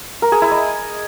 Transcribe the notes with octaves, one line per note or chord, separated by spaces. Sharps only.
A#4
G#4
E4
D#5